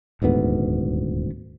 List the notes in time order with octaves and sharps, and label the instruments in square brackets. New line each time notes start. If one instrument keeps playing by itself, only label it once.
[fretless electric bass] D#1 D2 G#2 B3